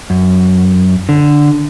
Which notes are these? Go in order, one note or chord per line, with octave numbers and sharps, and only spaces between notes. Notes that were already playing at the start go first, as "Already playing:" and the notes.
F#2
D3